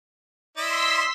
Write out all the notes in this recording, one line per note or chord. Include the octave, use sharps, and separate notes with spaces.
E4 D5 D#5 C6 E6 B6